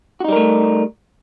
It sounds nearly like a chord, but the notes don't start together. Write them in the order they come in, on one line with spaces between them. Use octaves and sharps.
F#4 D#4 G3 A#4 A3